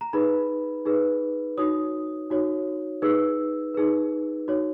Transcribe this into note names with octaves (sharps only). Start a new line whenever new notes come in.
A#5
D#4 G#4 B4 B5
D#4 G#4 B4
D#4 F#4 C#5 D#6
D#4 F#4 C#5
D#4 G#4 B4 E6
D#4 G#4 B4
D#4 F#4 C#5